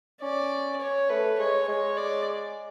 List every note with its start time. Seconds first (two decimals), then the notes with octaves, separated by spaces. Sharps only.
0.22 C#4 D5
0.81 C#5
1.09 A3 B4
1.39 G#3 C#5
1.68 G#3 C#5
1.97 D5